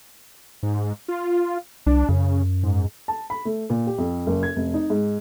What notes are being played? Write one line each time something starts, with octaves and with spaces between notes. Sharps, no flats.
G#2
F4
C2 D4
F#2 C#3
G#2
A5
B5
A3
A#2
G4
F2
F#1
G#6
F1
D#4
G#2